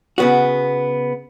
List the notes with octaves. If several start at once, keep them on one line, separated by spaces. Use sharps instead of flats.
C#3 B3 F#4